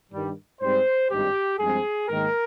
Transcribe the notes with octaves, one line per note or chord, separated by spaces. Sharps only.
G2 D#3 G3
G#2 G3 C4 C5
G#1 G2 G3 C4 D#4 G4
G2 F3 G#3 C4 G#4
G#2 D#3 A#3 D#4 A#4